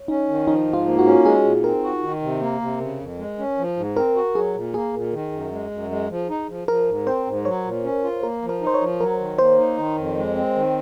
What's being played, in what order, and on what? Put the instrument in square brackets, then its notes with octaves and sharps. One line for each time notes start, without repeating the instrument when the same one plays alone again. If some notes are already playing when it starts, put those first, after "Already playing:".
Already playing: [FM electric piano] C#5
[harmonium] C#4 [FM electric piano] D#4
[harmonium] D#3
[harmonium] F3 [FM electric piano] D#4
[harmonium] G#2
[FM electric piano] F4
[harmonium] A#3
[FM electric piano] F#4
[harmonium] C#4
[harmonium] G#3 [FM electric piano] G#4
[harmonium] A#2
[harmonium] C4 [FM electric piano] A#4
[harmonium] F#4
D#3
C3
A#3
C3
C#3
F2
G#3
C#4
F3
G#2
[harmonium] C4 [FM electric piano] A#4
[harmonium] F#4
[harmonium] F#3 [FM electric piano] G#4
[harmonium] A#2
[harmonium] A#3 [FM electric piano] G#4
[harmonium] A#2
D#3
F#2
G#3
F#2
G#3
F3
D#4
F3
[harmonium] F3 [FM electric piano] A#4
[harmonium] G#2
[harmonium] C4 [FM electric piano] C5
[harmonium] G#2
[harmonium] F#3 [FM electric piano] C#5
[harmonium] A#2
C#4
F4
[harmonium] A#3 [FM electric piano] A#4
[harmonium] F3
[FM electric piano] A#4
[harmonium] D#4
[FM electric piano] C5
C#5
[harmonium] F3
[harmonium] F#3 [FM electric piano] A#4
[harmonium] D#3
[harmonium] A#3 [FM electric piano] C5
[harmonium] D#4
D#3
F2
G#3
C4
D#3